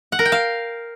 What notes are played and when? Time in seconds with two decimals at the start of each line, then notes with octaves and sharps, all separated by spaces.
0.12 F#5
0.19 A#4
0.25 G5
0.32 F5